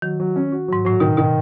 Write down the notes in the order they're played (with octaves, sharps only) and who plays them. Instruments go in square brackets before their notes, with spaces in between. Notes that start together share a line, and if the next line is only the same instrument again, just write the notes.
[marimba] D#3 [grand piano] F#3
[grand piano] F#3
C#4
F#4
[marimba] G#2 [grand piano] F#3
[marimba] A2 [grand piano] F#3
[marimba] B2 [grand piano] D#3
[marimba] B2 [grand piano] D#3